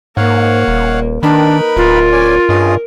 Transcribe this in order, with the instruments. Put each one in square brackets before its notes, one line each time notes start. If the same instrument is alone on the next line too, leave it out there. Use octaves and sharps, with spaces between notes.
[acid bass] G#2 [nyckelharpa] A#3 [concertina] C#5 F5 F#5
[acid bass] D#1
[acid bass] D#3 [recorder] D4 [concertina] D#4 B4 B5 [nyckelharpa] A#4
[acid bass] D1 [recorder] F4
[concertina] C#4 D5 G#5
[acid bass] G2 [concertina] C#4 G#4 D#5